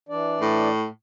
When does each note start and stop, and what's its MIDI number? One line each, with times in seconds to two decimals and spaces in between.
0.09 0.69 52
0.09 0.69 62
0.09 0.69 74
0.41 0.87 45